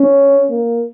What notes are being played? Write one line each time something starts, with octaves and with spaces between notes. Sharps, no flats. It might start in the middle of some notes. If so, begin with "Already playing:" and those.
Already playing: C#4
A#3